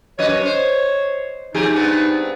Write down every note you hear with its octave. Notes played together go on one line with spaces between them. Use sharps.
F#2 B4 C#5 D#5
C5
F2 D#4 G4 G#4
G2 B3 C4